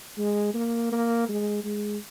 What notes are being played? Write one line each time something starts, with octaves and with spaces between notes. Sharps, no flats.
G#3
A#3
A#3
G#3
G#3